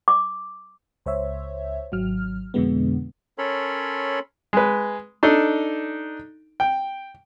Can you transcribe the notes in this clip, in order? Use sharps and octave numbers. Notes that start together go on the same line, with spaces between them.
D6
C#2 C5 C#5 E5
G#1 F#3 F6
F2 B2 D3 G#3 B3
C#4 A4 A#4 C#5 B5 C6
G#3 B4
D4 D#4 A4
G5